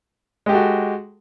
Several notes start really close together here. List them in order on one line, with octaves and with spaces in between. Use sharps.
G#3 G4 A4 F#4